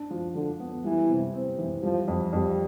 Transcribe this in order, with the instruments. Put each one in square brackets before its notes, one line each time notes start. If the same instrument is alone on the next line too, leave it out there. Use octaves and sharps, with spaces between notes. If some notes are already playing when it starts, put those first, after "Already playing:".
Already playing: [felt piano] D4
F3
[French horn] D3 [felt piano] F3
[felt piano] B3
[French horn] E3 [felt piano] G3
[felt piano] C3
C4
E3
[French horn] F3 [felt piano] G3
[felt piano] F2
[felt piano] F2 [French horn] G3